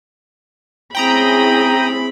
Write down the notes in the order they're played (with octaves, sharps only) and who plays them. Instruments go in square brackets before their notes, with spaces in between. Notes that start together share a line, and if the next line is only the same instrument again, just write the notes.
[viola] C4 B5 [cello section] C#4 E4 G#4 [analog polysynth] G5 A#5 D#6